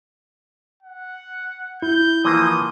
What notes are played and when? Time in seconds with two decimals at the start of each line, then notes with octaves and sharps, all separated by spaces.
0.83 F#5
1.82 E4 G6
2.25 E3 F3 A#3 D#6